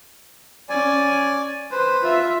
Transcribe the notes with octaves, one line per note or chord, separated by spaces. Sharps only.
C#4 D5 G#5
B4 C5
F4 E5